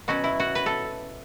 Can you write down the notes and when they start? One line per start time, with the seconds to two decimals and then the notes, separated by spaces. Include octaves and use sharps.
0.08 B2 F#3 C#4 F#4
0.24 E4
0.40 F#4
0.55 B4
0.66 A4